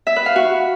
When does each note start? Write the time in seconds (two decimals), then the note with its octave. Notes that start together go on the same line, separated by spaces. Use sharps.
0.07 E5
0.16 B4
0.26 F5
0.36 F#4